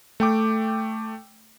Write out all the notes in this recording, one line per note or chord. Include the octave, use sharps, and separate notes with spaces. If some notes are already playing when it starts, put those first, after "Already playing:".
A3 G5 D6